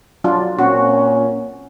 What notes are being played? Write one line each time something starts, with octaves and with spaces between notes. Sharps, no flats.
F#3 D4 F4
A#2 C4 C#4 F#4